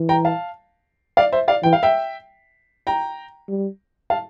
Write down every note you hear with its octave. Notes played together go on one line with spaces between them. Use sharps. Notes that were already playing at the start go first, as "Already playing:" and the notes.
Already playing: E3
G5 A#5
F5 A5
D5 F5
C5 E5
D5 F5
E3 G5
F5
E5 G5
G5 A#5
G3
F5 A5